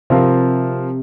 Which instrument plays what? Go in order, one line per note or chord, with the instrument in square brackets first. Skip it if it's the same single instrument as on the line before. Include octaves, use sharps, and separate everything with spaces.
[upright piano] C3 [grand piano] F3 C4 F4 A#4